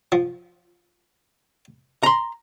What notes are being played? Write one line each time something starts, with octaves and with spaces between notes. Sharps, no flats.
F3
A#5 C6